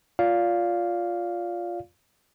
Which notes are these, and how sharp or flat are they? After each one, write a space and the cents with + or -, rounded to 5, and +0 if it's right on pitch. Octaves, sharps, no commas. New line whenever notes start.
F4 +0 D5 -30 F5 +0